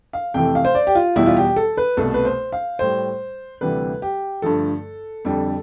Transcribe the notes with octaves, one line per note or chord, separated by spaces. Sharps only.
F5
F2 C3 E3 A3 G5
F5
C5
D5
G4
F4
E2 B2 G3 E4
F4
G4
A4
B4
C2 B2 A3 A4
B4
C5
F5
A2 G3 C5
D2 C3 E3 G3 B4
G4
G2 D3 F3 A3 A4
F2 D3 G3